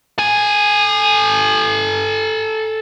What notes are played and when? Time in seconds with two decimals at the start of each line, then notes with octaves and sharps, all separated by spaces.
0.18 A4 G#5